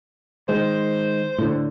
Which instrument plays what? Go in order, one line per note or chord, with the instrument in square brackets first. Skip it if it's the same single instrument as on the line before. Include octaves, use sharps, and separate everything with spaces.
[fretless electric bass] D#3 G#3 [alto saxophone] C5
[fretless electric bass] A2 D3